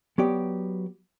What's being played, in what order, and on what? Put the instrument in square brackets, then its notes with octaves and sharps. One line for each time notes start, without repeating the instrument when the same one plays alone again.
[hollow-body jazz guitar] F#3 B3 G4 D5